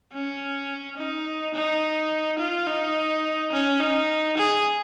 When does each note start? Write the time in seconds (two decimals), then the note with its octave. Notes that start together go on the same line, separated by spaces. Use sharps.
0.13 C#4
0.97 D#4
1.54 D#4
2.39 F4
2.68 D#4
3.53 C#4
3.80 D#4
4.38 G#4